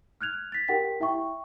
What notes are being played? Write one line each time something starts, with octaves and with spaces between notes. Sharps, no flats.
F6 F#6 G#6 F7
A6 B6
G4 A#4 F#5 G5 B6
E4 E5 G5 C#6